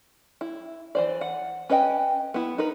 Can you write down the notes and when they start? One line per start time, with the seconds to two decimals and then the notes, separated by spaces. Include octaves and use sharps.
0.41 E4
0.95 E3 C5 D5
1.21 F#5
1.69 C#4 B4 D#5 G5
2.34 B3 E4
2.58 D#4 A#4 B4